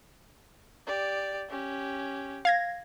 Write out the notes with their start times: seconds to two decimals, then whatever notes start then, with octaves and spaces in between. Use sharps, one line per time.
0.87 G4 D5
1.50 C#4 G4
2.45 F5 G#6 A#6